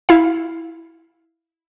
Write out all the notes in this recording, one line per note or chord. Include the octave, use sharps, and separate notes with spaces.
E4 F5